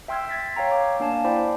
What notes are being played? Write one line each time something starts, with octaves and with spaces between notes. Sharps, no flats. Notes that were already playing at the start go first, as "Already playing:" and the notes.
E5 G5 C6 E6 F6 G#6
G#6 A6 B6
C#5 F5 G5 A#5
D6
A#3 D4 F5 G#5 A5
E4 C5 D5 G5 B5 D6